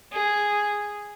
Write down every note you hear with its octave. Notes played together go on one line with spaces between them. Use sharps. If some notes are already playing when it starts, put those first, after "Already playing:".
G#4